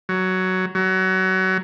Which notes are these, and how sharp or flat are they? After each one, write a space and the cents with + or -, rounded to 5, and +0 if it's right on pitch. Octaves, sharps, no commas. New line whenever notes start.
F#3 +10
F#3 +25